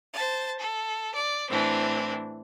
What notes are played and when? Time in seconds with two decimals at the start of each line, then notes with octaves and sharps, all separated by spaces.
0.14 C5 A5
0.59 A4
1.15 D5
1.49 A2 E3 C4 D4